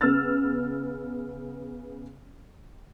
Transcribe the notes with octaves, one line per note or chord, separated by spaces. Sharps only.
C#3 B3 E6 F6 A6